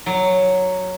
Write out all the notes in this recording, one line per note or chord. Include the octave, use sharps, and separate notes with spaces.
F#3